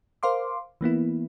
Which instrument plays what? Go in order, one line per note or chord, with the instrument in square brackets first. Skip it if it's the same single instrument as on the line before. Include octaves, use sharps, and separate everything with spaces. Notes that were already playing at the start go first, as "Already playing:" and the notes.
[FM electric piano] A#4 C5 F5 C6 D6
E3 A#3 B3 E4